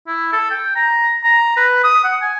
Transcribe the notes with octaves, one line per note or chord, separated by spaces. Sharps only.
E4
A4
G5
A#5
A#5
B4
D#6
F#5
G#5